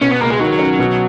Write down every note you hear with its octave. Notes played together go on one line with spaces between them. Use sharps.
B2 C#4
B3
C#2 A#3
G#3
D#3 F#3
C#4
B2